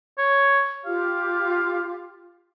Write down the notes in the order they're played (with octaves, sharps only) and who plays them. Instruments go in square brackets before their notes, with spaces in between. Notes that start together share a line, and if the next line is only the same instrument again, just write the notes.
[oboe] C#5
[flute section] F4 G4 [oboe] F5